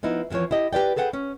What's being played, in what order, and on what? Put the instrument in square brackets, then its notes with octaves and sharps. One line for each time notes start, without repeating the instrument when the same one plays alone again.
[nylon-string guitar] F3 B3 D#4 E4
F2 C3 E3 F3 C#5
E4 G4 D#5
G4 B4 D5 G5
G#4 A4 B4 F#5 G5
C#4